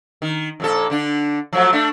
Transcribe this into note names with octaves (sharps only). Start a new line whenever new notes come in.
D#3
F2 A#2 A4
D3 D4
F3 F#3 A3
A3 D4